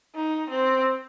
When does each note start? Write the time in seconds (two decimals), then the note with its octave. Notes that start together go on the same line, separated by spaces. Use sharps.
0.15 D#4
0.50 C4